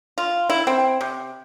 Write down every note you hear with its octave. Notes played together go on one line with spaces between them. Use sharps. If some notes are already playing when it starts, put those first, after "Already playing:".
F4
E4
C4
C3